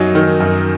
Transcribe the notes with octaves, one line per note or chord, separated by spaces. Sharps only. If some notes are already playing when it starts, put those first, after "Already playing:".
Already playing: F#2 F#3 D#4
D#3
F#2